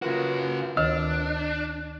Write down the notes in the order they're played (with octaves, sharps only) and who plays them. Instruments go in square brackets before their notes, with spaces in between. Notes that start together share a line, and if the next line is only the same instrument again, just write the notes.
[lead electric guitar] C#3 F#4 [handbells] F4 A#4 B4
[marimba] D2 D#3 [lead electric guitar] D4